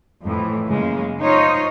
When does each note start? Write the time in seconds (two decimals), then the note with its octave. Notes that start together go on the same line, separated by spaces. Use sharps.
0.23 F2 A2 E3
0.67 F#2 C#3 G#3 A#3
1.20 D#4 F4 C5 C#5 D#5